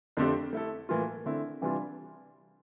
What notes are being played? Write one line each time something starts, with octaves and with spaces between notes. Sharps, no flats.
F2 D3 A3 C4 G4
A3 E4 A4
A2 E3 A#3 F4
D3 A3 C4 E4
C3 E3 G3 D4 F4